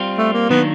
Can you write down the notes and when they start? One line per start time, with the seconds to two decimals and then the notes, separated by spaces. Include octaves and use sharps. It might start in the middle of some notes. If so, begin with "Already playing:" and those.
Already playing: G3 C4 F4
0.18 A3
0.34 A#3
0.50 D#3 F#3 A#3 B3 D4